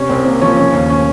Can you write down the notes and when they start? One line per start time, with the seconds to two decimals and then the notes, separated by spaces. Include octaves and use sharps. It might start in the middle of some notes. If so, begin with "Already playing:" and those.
Already playing: C3 C#4
0.09 C2 C4
0.25 A#3 C4
0.41 F3 C#4
0.57 C#3 C#4
0.73 D#2 C#4
0.90 C#4